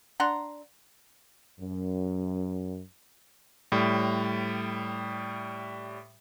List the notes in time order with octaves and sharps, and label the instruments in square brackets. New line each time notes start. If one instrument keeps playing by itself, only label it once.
[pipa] D4 F#5 A#5 C6
[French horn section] F#2
[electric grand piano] A2 G3